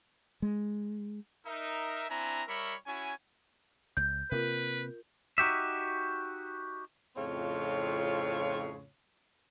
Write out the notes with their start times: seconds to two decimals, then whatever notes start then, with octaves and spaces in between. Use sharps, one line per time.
0.42 G#3
1.47 D#4 A#4 E5
2.10 C4 D4 E4 G#5 A#5
2.48 G3 A#4 C#5 E5 B5 C#6
2.87 C#4 E4 F#4 G#5
3.97 C#2 G6
4.32 C3 A#3 F4 A#4 B4
5.38 D#4 F#4 G4 E5
7.16 F2 A2 C#3 C4 F4 C#5